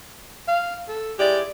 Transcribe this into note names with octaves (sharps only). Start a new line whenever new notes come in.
F5
A4
G#3 E4 G4 D5